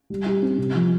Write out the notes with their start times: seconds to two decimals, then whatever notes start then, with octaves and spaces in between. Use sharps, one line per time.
0.10 G3
0.26 G4
0.42 C4
0.58 C3
0.75 F3